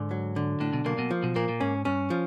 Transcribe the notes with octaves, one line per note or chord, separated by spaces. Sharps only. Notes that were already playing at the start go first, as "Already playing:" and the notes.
Already playing: G#2 D3
F#3
D3
A2 D4
B1 B2
B1 B2 A#3
B1 B2
F3
B1 B2
A#2 A#3
A#2
G#2 C#4
G2 C#4
F3